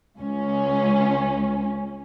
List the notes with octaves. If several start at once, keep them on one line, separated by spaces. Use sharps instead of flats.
C#2 C#4